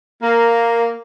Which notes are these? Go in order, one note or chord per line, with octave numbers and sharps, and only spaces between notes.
A#3